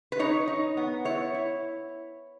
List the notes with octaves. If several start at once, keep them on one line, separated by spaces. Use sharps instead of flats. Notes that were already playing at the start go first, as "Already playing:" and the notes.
B4
D#4 C#5
D#4
B3
E4 C#5
E4